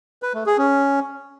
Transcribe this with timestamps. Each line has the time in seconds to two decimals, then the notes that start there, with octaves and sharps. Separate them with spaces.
0.23 B4
0.34 A3
0.46 G#4
0.58 C#4